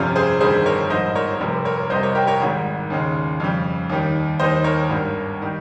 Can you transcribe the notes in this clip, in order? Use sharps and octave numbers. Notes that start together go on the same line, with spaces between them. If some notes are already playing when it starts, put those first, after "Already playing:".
Already playing: G1 F2 C3 G3 C#4 F4
G#4 C5
G1 G2 D#3 G3 G#4 C5
A#4 C#5
A#1 G#2 G3 C5 D#5
A#4 C#5
F1 F2 C3 G3
A#4 C#5
C2 C3 G3 C5 D#5
A#4 C#5
G4 A#4
A#4 C#5
G#1 G#2 D#3 G3
D#2 C#3 G#3
F2 C#3 G3
D#2 D#3 G3
D#2 D#3 G3 C5 D#5
A#4 C#5
G#1 G2 G3
D#3 G3